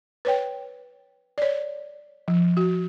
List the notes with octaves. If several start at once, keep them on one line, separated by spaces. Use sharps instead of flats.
B4 C#5 G5
C#5 D5
F3
F#4